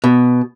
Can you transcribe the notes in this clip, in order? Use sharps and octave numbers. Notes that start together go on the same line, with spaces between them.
B2